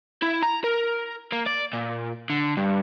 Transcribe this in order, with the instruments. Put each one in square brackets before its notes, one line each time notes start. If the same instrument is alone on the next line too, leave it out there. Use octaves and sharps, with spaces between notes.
[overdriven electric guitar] E4
A#5
A#4
A#3
D5
A#2
D3
G2